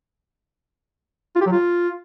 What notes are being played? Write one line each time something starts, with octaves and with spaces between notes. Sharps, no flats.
F4
G4
F#3
F4